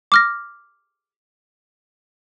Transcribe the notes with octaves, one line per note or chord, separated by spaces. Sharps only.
D6 F6 A#6